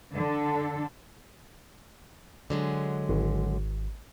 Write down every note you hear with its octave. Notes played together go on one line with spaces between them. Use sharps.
D3 A4
D3 F#3 G#3
G#1